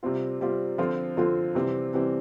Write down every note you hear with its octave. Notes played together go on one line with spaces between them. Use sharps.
C3 G3 C4 F4
C3 G3 C4 F4
D3 F3 C4 F4
D3 F3 C4 F4
C3 E3 G3 C4
C3 E3 G3 C4